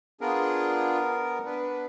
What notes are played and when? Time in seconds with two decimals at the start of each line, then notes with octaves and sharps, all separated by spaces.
0.21 B3 D4 F4 G#4 A#4
1.45 B3 D4 B4